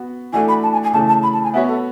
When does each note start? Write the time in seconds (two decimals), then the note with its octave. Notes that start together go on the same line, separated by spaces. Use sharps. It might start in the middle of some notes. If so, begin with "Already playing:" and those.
Already playing: B3 F#4
0.32 E3 A3 D4 F#4 A4 G#5
0.48 B5
0.63 A5
0.73 G#5
0.83 G#5
0.93 C#3 E3 A3 A5
1.08 A5
1.23 B5
1.33 A5
1.43 G#5
1.54 B3 F#4 C#5 E5
1.68 A4